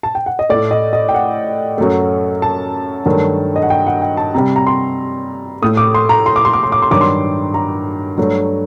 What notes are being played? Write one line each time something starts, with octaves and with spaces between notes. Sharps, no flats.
A5
G5
F#5
D#5
A2 A3 D5
D#5
D#5
G5
F#5
F#2 F#3 A3
A5
G2 D#3 F#3 A3
D#5
F#5
G5
F#5
G5
A5
C3 G3 A#5
A#5
C6
A2 A3 D#6
D6
C6
A#5
C6
D6
C6
D6
C6
D6
C6
G2 D#3 F#3 D6
C6
A#5
G2 F#3 A3